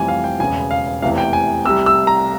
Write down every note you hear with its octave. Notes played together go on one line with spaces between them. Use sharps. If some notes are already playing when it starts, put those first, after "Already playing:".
Already playing: F1 F2 E3 G3 G#5
F5
G5
E1 E2 C#3 G#5
F5
F1 E2 C3 E3 F5
G5
G#5
C2 C3 G3 E6
E6
A#5